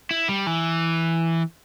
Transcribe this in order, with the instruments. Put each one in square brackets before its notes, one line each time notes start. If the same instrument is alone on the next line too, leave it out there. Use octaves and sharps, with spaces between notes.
[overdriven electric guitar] E4
G3
E3